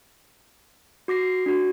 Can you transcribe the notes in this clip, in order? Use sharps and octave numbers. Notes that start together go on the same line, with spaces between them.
F#4 D6 A#6 C7
D4 F#4